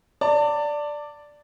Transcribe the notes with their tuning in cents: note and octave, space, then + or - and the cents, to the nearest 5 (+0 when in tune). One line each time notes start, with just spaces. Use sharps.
D5 +0 A5 +35